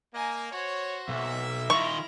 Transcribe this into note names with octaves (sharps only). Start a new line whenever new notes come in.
A#3 D#5 G#5
F#4 C5 C#5
B1 A#3 E5
D#3 E4 F4 A#5 C#6